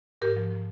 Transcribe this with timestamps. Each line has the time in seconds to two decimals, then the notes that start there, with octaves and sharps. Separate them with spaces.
0.22 G#2 G4 A#4
0.36 F3
0.51 F3